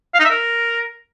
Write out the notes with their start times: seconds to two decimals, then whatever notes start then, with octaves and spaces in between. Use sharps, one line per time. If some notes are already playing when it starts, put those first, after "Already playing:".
0.14 F5
0.20 D#4
0.25 E5
0.30 A#4